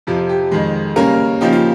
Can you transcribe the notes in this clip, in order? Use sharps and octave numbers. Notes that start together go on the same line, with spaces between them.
F2 C3 F3 F4
G4
F2 D#3 G#3
C#3 G3 A#3 C#4 A#4
C#3 F3 A#3 D#4 G4
F4